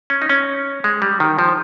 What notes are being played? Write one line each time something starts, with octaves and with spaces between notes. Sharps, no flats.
C#4
D#4
C#4
G#3
G3
D#3
F3